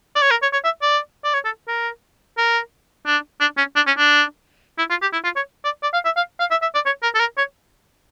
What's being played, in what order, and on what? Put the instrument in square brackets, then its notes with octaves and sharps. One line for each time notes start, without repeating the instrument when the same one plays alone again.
[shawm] D5
C#5
A#4
C#5
C#5
E5
D5
D5
C#5
A4
A#4
A#4
D4
D4
C#4
D4
C#4
D4
E4
F4
G4
E4
F4
C#5
D5
D5
F5
E5
F5
F5
E5
E5
D5
C#5
A#4
A4
A#4
C#5